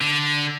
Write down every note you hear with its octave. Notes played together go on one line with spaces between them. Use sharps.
D3